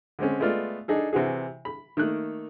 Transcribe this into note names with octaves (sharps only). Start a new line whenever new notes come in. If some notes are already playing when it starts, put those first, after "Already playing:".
D3 G#3 C4 C#4
G#3 A3 B3 F4 D5
D4 D#4 G#4 A4
C3 E3 F#4 G#4
B5
D#3 A3 A#3 F#6